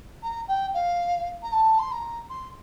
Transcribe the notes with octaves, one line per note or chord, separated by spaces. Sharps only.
A#5
G5
F5
A#5
A5
C6
A#5
C6